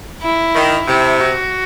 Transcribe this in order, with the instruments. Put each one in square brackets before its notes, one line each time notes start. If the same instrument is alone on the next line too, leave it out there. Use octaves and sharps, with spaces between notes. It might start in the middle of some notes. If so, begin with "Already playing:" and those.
[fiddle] E4
[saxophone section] D#3
[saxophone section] C3 [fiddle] E4
[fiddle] F#4